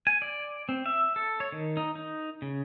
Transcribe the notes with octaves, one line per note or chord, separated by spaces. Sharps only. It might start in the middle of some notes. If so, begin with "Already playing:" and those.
G#5
D5
C4
E5
A4
C#5
D#3
D#4
D#4
C#3